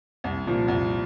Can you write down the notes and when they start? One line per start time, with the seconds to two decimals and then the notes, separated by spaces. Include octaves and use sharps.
0.24 C2
0.47 A#2 F3
0.68 C2